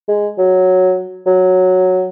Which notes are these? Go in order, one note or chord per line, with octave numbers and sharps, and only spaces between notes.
G#3
F#3
F#3